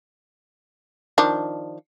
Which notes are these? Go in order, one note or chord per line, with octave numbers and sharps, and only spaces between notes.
D#3 F3 D4